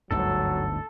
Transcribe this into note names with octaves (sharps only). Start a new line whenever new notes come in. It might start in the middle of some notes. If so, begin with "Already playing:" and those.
G1 D2 G#2 F#3 A4